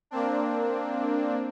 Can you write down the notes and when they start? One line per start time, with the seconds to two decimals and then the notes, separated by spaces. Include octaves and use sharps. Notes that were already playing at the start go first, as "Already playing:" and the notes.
0.11 A#3 C4 D4